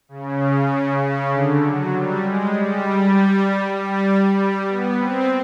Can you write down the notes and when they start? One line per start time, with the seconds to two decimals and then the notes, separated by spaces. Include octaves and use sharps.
0.09 C#3
1.00 C#3
1.31 D3
1.60 F#3
1.91 G3
2.21 G#3
2.53 G3
3.75 G3
4.20 G3
4.67 B3
4.97 C4